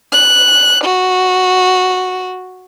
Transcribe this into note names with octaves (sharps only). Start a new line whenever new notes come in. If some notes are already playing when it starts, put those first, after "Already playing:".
F#6
F#4